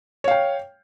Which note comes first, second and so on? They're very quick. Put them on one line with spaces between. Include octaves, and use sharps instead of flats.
C#5 F5 G5